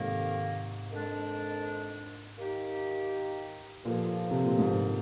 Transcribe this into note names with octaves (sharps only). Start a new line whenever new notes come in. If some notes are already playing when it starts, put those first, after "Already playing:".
Already playing: F2 G#2 C3 D#3 A#3
F2 D#3 G#3 D4
D#3 A#3 D#4 G4
G2 A#2 D3 F3 A#3 F4
C3
A#2
G#2